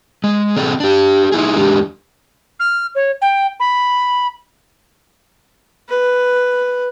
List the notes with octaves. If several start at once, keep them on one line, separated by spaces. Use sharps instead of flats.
G#3
C3 E3 C4 G#4 A4 D5
D4 G4
D#4 E4 G#4
E2 G#3 D4 G4
F6
C#5
G5
B5
B4